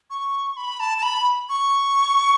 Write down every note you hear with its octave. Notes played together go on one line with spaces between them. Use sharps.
C#6
B5
A5
A5
B5
C#6